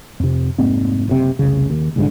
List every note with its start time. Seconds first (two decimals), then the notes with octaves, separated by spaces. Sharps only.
0.20 F2 C3
0.58 F1 G#2 A#3 C4
1.08 F#1 A2 C3
1.39 F1 C2 C#3
1.70 D#2
1.96 C2 G#2 D3